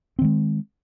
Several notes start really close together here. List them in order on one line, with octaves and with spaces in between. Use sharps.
C4 D#3 G#3